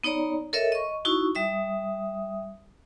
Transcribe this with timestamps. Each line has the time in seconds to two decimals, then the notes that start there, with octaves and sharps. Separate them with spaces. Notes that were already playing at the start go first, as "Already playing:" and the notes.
0.04 B3 D#4 C#5 D5 A#5
0.53 A4 A#4 C#5 D#5 E5
0.72 D#5 C#6
1.05 D#4 E4 F#4 C#6
1.35 G3 E5 D#6